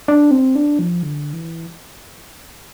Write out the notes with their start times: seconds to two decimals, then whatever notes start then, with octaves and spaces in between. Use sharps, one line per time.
0.08 D4
0.31 C4
0.56 D4
0.79 F3
1.03 D3
1.33 E3